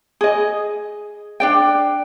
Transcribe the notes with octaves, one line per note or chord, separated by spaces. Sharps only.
G#4 D#5
D4 D5 G5